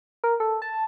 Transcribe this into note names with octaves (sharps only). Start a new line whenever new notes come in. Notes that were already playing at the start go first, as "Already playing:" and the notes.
A#4
A4
A5